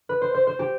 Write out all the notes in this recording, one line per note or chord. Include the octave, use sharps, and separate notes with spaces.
B4
C5
C5
C5
G4